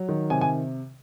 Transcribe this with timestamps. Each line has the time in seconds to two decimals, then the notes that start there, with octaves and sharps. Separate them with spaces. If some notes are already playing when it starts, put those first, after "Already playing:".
Already playing: F#3
0.09 D#3
0.30 C3 G#5
0.41 G#5